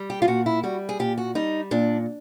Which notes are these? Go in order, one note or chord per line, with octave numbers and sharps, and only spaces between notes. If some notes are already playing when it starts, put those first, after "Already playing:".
Already playing: G3
G4
F4
A#2 F#4
E4
G3 F#4
G#4
A#2 G4
F#4
G3 D#4
A#2 D4